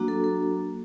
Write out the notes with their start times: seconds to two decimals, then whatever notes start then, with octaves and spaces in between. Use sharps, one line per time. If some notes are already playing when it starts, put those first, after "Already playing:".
Already playing: F#3 A#3 D4 F#4
0.08 A4
0.24 A4